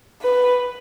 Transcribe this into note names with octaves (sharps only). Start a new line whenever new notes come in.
B4